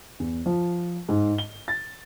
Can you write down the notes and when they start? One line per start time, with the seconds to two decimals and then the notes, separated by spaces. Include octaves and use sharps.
0.20 E2
0.46 F3
1.09 G#2
1.38 G7
1.68 A6